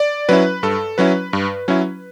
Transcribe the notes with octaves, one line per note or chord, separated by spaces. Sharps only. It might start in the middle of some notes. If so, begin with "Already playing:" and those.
Already playing: D5
F#3 C#4 E4 B4
G2 A4
F#3 C#4 E4 B4
G2
F#3 C#4 E4